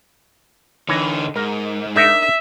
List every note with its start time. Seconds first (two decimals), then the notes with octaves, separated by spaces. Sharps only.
0.89 D3 E3 D#4 C#5 D#5
1.36 G#2 A#4
1.95 D4 D#4 A#4 E5